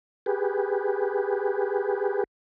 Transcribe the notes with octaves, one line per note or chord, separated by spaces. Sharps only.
G4 G#4 B4